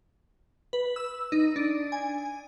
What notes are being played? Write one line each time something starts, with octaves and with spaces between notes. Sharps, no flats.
B4
E6
D#4
D4
G#5